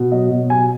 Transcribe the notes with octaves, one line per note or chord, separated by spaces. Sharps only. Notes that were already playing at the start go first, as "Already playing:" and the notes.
Already playing: B2
F#3 D#5
B2
F#3 G#5